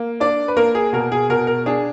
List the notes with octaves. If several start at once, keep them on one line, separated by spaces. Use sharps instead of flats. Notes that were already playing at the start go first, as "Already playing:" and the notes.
Already playing: A#3
D4 D5
B4
A#3 A#4
G#4
B2 A#4
G#4
B2 A#4
A#4
D4 G#4